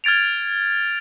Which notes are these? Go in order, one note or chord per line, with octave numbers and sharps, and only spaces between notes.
F6 G#6 A6 D7 F7